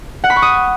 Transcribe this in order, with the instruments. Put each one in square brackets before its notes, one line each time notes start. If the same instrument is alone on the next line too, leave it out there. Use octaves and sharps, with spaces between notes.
[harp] F#5
B5
C#6
D#6